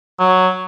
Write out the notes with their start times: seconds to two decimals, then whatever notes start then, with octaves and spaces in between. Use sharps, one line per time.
0.19 F#3